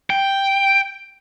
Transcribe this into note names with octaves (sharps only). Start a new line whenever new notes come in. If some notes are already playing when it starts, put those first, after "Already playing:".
G5